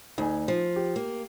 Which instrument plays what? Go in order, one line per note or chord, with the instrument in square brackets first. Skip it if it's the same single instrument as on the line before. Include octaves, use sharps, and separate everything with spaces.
[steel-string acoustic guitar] D2 [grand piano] D#4 G#5
[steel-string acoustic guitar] F3
[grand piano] G4
[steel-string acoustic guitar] A#3